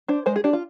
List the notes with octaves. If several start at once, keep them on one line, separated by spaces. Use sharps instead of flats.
D4 C5
G#3 C5
G#4
D4 G4
F4